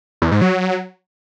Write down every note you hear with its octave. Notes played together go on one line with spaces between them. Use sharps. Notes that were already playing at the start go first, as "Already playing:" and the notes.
E2
G#2
F#3